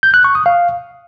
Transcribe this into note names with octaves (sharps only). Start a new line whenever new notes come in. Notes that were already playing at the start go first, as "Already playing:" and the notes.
G6
F#6
C#6
D#6
F5